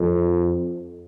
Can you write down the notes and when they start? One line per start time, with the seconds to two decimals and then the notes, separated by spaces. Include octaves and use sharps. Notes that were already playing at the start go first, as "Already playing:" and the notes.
Already playing: F2